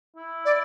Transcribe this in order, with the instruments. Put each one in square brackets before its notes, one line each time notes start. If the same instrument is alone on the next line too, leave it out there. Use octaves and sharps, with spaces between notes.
[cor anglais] E4
[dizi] D5